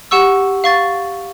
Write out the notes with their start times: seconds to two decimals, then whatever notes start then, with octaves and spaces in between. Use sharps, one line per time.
0.11 G4 F#5 C#6 E6
0.64 F5 C#6 A6